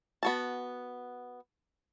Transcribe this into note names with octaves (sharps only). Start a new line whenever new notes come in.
B3 F#4 A5